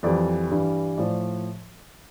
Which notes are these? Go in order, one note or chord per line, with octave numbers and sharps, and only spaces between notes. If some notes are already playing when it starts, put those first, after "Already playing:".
F2 E3 G3 D5
G2 E3 G3
A2 F3 D5